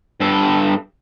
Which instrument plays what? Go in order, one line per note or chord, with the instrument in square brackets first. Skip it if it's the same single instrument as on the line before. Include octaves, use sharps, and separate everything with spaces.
[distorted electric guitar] G2 A4